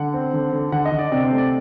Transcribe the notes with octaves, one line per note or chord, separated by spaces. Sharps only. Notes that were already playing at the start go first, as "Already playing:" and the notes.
Already playing: D3 F#5
C4
D3
D3
D3 F#5
D#5
D3
D5
C3 D5
C5
A3
D5